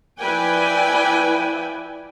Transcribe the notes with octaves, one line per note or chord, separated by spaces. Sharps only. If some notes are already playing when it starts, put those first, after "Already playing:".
F3 E4 B4 D5 G5 G#5